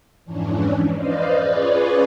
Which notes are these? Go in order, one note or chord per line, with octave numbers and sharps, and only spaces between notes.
F2 G#2 E3 C#4 D4
B4 C5 D5 D#5 F5
C#4 F4 G#4 B4 C#5 D5